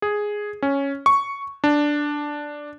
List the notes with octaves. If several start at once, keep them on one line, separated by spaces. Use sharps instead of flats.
G#4
C#4
C#6
D4